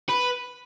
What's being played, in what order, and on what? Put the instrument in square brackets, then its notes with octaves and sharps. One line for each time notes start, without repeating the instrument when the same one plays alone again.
[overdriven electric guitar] B4